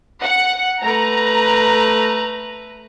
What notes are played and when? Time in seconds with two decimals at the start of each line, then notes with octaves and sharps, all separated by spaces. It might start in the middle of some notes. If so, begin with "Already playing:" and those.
0.22 F#5
0.82 A3 B4 A#5